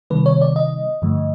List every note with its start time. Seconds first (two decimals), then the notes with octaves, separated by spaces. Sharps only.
0.10 C3 D#3 G3 B3 B4
0.26 C#5
0.41 D5
0.56 D#5
1.02 G2 D3 F3 A3